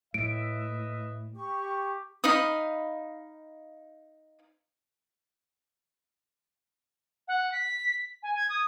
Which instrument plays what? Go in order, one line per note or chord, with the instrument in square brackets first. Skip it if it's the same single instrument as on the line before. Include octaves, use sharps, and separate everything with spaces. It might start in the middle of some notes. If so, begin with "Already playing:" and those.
[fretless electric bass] A2 [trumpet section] B4 D#5 E5 [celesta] D7
[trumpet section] G4 [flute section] C#6
[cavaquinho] D#4 F5 B5 D#6
[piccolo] F#5
B6
G#5
G#6
D#6